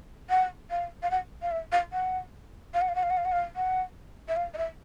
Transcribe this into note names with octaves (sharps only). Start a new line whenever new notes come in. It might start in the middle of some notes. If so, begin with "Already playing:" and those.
F#5
F5
F5
F#5
F5
E5
F5
F#5
F5
F#5
F5
F#5
F5
F#5
F5
F#5
F5
F#5
E5
F5
D#5
E5